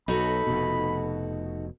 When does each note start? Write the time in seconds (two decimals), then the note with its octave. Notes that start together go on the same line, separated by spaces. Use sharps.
0.08 B1 D#4 F#4 A4 B5
0.47 F1 B2